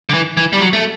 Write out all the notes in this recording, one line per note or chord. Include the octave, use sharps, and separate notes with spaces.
D3
E3
E3
G3
F#3
A3